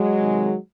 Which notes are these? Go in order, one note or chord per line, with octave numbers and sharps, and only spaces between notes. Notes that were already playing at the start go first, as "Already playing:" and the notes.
Already playing: F#3 G#3
C3 D#3